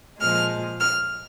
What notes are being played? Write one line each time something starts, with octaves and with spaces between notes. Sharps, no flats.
A#2 F3 G#3 F6
F6